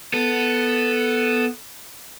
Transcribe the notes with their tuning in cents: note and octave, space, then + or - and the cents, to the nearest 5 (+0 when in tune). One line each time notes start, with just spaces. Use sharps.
B3 +0 A4 +0